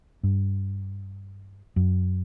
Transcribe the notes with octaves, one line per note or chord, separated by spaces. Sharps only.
G2
F#2